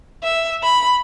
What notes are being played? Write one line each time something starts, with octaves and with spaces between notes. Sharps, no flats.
E5
B5